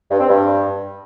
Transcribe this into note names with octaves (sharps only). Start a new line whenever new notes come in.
G2
C4
G2